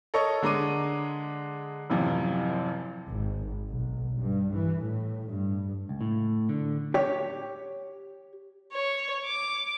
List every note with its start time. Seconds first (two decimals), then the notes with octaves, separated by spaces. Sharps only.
0.14 A4 A#4 C#5 D#5 C#6
0.42 D3 G#3 A#5 D6 D#7
1.90 A1 F#2 C3 E3 F3
3.09 G#1
3.69 B1
4.19 G2
4.53 E3
4.83 A2
5.29 G2
5.89 C#2
6.01 A2
6.49 D3
6.94 G4 C#5
8.72 C#5
9.25 D6